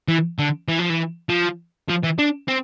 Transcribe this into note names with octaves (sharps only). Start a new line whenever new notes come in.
E3
D3
E3
F3
E3
F3
F3
E3
D4
C4